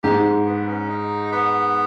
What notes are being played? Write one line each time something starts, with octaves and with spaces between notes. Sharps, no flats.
G#2 G4
B3
C#4
D#4
B3